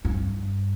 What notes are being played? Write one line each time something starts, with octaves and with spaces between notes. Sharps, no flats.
G2